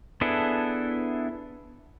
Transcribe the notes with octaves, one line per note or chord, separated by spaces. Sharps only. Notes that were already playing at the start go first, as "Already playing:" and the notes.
B3 D4 E4 G#4 A4